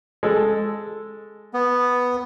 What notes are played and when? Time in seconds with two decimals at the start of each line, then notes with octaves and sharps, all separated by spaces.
0.23 G#3 A4
1.54 B3